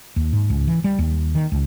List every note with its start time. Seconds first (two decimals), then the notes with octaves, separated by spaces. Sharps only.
0.16 D#2
0.33 G#2
0.50 C#2
0.68 E3
0.84 G3
0.98 D#2
1.35 D#3
1.52 C#2